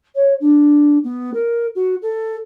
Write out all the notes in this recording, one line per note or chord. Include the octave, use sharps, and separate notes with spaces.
C#5
D4
B3
A#4
F#4
A4